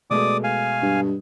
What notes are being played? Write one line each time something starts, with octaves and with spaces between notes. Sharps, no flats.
B2 G#3 A3 D5 D6 D#6
F5 G#5
G2